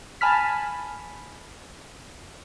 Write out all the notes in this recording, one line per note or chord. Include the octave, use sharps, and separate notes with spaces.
G#5 A5 B5 F6 B6